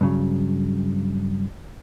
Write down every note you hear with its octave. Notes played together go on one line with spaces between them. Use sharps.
G2 C#3 F#3